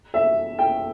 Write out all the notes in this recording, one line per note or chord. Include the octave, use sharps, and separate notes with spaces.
E5
G5